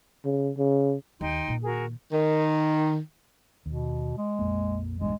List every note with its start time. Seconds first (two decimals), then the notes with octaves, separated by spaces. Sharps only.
0.25 C#3
0.57 C#3
1.21 D#2 D#4 G5 C6
1.48 A#2 D#3
1.63 F#4 G#4 A#4
2.11 D#3
3.66 D#2 B2
4.17 G#3
4.39 A#1 F2 A#3
5.00 A#1 E2 G2 G#3